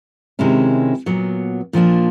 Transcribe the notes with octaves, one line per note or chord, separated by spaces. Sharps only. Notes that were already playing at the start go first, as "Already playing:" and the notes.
C3 D#3 G#3 C#4 E4
A#2 F#3 B3
A#2 F3 A#3 D4 F4